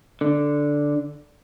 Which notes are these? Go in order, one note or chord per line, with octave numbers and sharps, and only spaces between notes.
D3